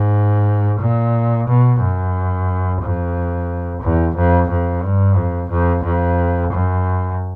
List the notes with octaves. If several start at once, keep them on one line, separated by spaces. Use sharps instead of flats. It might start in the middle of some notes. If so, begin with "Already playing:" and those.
Already playing: G#2
A#2
B2
F#2
F2
E2
F2
F2
G2
F2
F2
F2
F#2